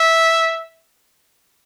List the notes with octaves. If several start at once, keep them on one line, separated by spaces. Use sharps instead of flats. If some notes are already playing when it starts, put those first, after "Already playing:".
Already playing: E5